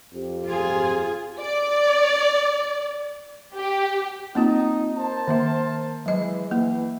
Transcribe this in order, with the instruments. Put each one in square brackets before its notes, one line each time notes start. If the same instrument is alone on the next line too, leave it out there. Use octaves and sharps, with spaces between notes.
[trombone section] F2 C4 G4
[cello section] F4 G#4
[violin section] D5
G4
[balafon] A#3 C4 F4 [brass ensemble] D#4
[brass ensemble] A#4 C5 A5
[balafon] D#3 A#3 E5
[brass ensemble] E3 G#3 [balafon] F#3 D#5
[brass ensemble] E3 [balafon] A#3